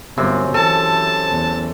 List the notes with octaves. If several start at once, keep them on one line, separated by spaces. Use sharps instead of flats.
G1 F#2 C3
E3 A4 A5
E2